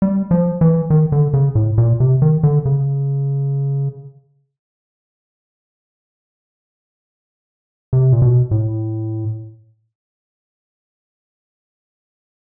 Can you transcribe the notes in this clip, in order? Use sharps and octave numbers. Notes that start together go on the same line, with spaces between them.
G3
F3
E3
D#3
D3
C#3
A2
A#2
C3
D#3
D3
C#3
C3
A#2
B2
A2